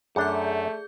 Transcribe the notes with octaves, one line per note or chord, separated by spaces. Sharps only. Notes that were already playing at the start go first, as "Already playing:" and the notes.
F#2 A3 D4 G#4 D5 G6